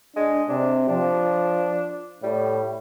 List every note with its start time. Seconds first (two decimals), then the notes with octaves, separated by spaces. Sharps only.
0.16 G#3 D4
0.49 C3 D4
0.89 F3 D4
2.23 A2 G3